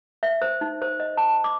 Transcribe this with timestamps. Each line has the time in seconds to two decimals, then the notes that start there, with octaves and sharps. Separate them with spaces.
0.23 E5
0.42 C5
0.61 D#4
0.82 C5
1.00 D#5
1.17 A5
1.44 D6